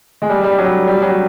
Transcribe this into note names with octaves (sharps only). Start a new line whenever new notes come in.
G#3
G3
G3
F#3
G3
F#3